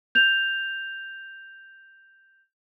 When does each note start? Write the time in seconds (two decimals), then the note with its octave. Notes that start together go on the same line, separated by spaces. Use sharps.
0.15 G6 F7